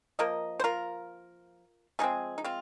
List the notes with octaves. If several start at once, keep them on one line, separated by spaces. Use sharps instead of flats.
F3 A#3 A#4 D#5
C5
F4 A#4
F3 G#3 C4 D#4 G#4
D#4
C4 F4